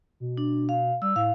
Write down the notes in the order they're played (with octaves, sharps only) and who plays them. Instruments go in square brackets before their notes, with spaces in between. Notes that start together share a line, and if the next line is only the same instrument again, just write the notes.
[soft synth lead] B2
[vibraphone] D4
F5
[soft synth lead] G3 [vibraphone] E6
[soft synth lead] A2 [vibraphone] F5